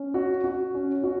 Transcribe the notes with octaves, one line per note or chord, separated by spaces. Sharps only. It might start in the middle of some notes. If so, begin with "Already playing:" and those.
Already playing: C#4
F#4
F#4
C#4
F#4